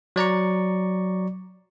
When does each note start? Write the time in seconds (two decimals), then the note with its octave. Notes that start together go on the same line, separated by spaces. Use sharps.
0.16 F#3 D5 A#5 C#6